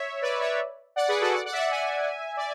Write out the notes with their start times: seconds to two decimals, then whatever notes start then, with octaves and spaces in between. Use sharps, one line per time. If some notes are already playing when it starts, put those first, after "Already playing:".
Already playing: C#5 E5
0.22 B4 D5
0.40 C#5 E5
0.96 D5 F#5
1.08 G#4 B4
1.21 F#4 A4
1.33 D5 F#5
1.45 D5 F#5
1.52 E5
1.58 D5 F#5
1.70 E5 G#5
2.37 D5